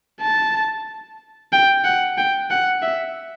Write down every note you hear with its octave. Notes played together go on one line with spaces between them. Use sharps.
A5
G5
F#5
G5
F#5
E5